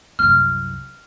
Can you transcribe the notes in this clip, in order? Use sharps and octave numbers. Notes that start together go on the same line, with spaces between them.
C2 F#2 F6